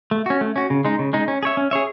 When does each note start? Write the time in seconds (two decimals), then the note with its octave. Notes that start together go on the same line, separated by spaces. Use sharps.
0.11 A3
0.26 C#4 F#4
0.41 A3
0.56 C#4 F#4
0.70 C#3
0.85 G#3 D#4
0.99 C#3
1.13 G#3 D#4
1.28 C#4
1.43 G#4
1.45 C#5 E5
1.57 C#4
1.71 G#4 C#5 E5